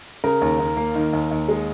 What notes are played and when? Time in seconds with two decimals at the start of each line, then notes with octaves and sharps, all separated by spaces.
0.24 C#3 A#4
0.41 D#2
0.60 D#2
0.77 A#3
0.95 D#3
1.13 D#2
1.31 D#2
1.49 G#3